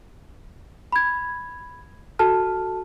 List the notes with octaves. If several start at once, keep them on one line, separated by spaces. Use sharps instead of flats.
B5 G#6
F#4 A4 A5 F6